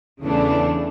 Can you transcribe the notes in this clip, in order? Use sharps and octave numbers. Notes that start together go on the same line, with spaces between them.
E2 C#3 E3 A3 D4